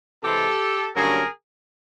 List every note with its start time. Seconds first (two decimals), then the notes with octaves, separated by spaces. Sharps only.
0.23 C3 E3 G#3 C4 G4 A4
0.96 G2 D3 F#3 A#3 C#4 G#4 A#4